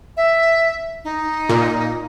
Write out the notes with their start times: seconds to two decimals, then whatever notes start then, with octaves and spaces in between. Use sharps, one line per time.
0.17 E5
1.04 D#4
1.49 A#2